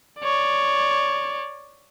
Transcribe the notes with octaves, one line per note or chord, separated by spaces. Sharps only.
C#5 D5